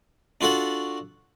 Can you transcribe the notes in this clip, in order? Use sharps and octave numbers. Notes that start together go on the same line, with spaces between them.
D4 F4 F#4 A4 F#5